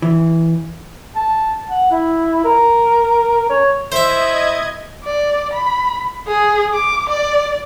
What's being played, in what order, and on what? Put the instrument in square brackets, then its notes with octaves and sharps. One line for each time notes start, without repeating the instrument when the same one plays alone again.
[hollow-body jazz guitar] E3
[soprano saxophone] A5
F#5
E4
A#4
C#5
[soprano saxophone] E4 [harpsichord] C5 E5 [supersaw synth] D#5 G#6
[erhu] D5
B5
G#4
D6
D5